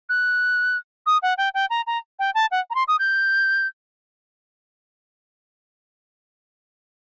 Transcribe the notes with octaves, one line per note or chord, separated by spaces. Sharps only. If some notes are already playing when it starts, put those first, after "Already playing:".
F#6
D#6
F#5
G5
G5
A#5
A#5
G5
A5
F#5
A#5
C6
D#6
G6